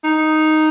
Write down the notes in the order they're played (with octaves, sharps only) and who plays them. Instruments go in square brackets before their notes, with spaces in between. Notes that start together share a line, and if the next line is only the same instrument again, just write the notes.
[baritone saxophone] D#4